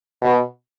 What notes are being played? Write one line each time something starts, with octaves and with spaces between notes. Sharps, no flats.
B2